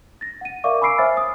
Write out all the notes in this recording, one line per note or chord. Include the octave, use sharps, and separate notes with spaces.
A6 A#6
F#5 D#7
A#4 D5 E5 F5 C#6 D6
G#5 B5 D6 E6 C7 D7
C5 C#5 E5 G#5 F6 A6
D#6